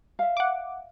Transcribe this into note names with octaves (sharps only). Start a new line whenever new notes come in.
E5 F5
F#5 D6